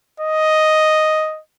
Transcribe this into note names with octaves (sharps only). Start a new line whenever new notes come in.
D#5